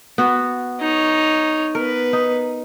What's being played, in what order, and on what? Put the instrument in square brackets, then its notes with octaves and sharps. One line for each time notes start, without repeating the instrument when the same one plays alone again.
[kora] B3 F#4
[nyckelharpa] D#4 C#5
[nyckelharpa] B3 B4 [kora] A#4
[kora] D#4